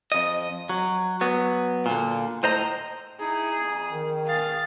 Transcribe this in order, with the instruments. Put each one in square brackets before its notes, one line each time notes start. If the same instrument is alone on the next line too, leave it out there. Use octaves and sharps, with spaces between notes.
[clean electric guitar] F2 D#5
F#3
F#3 B3
A#2 D3
A2 C5 D#5 A#5
[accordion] D#4 E4 [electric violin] G#4
[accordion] F2
[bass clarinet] D#3
[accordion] B2 G#4 [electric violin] F5 A6